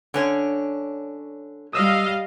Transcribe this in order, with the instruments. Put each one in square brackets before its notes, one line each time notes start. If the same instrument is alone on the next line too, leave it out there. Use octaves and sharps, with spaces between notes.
[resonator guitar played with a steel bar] D3 C#4 D4
[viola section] G3 D#5 F5 [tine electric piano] D#6 E6